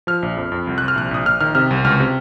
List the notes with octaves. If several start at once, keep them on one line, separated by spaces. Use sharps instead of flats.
F3 F6
A#1
F2
F2
C2
C2 F#6
F6
A#1 F#6
A#1 D#6
A#1 F6
D#3 F6
C3 F6
C2
C#2 F6
C3